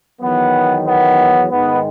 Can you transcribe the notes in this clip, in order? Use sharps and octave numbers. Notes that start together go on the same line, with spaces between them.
E2 D#3 F#3 B3
B3
G#2 D#3 G#3 B3